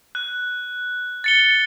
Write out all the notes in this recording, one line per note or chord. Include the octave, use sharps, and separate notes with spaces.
F#6
A6 C#7 G7